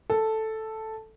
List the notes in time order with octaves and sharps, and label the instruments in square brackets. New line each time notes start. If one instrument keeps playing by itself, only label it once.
[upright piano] A4